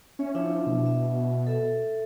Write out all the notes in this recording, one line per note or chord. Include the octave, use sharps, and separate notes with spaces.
C#4 C#5 E5
F3 D4 E4 E5
B2
E5
A4 E5